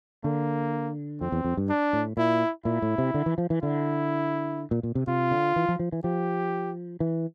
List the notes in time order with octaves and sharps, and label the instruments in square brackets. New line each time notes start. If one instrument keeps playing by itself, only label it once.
[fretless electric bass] D3 [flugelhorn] A#3
[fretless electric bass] F2 [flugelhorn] C4
[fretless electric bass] E2
F2
G2
[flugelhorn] D4
[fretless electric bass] A2
[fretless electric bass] A#2 [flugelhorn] E4
[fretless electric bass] A#2 [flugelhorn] E4
[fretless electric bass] A2
C3
D3
E3
F3
E3
[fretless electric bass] D3 [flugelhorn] E4
[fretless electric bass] A#2
A#2
C3
[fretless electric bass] C3 [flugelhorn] F4
[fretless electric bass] D3
E3
F3
F3
E3
[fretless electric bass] F3 [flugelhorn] G4
[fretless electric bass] E3